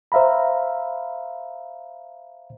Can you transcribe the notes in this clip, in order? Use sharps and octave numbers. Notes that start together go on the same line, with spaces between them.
C5 E5 F5 A#5 B5